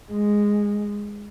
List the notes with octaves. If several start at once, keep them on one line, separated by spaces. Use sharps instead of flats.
G#3